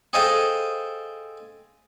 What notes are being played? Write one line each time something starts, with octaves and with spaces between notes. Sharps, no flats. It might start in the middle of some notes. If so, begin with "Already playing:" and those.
G#4 A4 C5 D#5 F5 G5